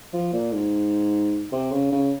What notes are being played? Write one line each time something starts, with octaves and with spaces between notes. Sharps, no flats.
F3
A#2
G#2
C3
C#3
C#3